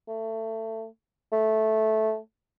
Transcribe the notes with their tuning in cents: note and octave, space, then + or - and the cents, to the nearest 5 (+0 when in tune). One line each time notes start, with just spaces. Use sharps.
A3 +20
A3 -10